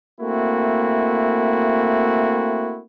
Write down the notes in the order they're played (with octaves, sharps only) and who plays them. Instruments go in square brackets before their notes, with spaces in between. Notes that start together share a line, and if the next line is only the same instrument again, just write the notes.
[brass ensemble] A3 A#3 C4 E4 F#4